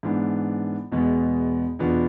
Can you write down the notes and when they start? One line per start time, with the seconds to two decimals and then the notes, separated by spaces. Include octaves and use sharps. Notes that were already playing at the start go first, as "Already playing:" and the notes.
0.03 G#2 E3 B3 D4
0.92 E2 B2 G#3 B3
1.79 E2 B2 B3 D4 F4